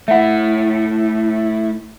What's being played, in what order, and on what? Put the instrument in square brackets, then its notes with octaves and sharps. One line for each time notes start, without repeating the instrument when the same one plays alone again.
[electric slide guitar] A3 E4 [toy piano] E5 F#5